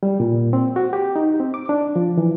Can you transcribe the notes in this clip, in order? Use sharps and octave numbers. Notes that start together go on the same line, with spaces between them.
G3
A#2
C4
F#4
G4
D#4
C4
D6
D4
F3
E3